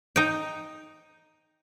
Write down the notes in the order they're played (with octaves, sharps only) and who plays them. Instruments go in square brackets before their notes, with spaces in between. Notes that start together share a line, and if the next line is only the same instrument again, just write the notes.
[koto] D#4 G5